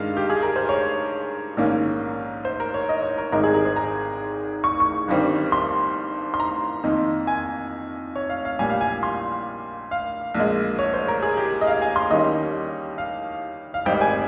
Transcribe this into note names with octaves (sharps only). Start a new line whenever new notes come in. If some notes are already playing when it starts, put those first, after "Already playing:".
Already playing: G2 D#3 G#3 F5
G4
G#4
A#4
C5
C#5
A#1 G#2 D#3 A#3 C#4
C5
A#4
C#5
D#5
C#5
A#4
G#1 G#2 D#3 G#3 D#4 A#4
G#4
A#4
C5
A#5
C#6
C#6
G1 G2 D#3 G3 C4
C6
C6
A#5
F2 D#3 A#3 D#4
G#5
C#5
F5
F5
A#1 A#2 G3 G#5
F5
G#5
C6
F5
A#1 A#2 G#3
C#5
C5
A#4
G#4
G4
D#5
F5
G#5
C6
D#2 D#3 G3 C#4 D#5
F5
F5
G#1 G#2 G3 C4 D#4 G5
G#5